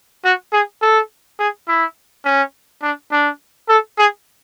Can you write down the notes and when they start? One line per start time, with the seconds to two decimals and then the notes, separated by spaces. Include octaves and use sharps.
0.25 F#4
0.53 G#4
0.82 A4
1.39 G#4
1.68 E4
2.25 C#4
2.82 D4
3.11 D4
3.69 A4
3.98 G#4